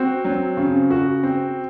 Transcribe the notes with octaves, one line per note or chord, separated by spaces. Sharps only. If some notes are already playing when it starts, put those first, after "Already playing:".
Already playing: C4 F#4
F#3
C#3
F#4
C4